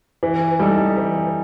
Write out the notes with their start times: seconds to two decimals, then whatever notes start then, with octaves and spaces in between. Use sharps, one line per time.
0.23 E3
0.59 G3 D#4 A4
0.97 E3